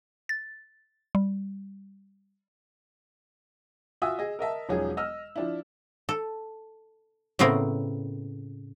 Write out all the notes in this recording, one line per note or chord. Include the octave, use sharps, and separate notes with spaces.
A6
G3
F4 F#4 E5 G#5 D#6 E6
G#4 D#5
A#4 D#5 E5 A5
E1 F3 F#3 C#4 D#4 G#4
D#5 E6 F6
F3 D4 E4
A4
A2 C#3 B3 C4 A#4